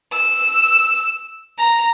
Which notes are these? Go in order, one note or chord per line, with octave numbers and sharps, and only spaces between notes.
E6
A#5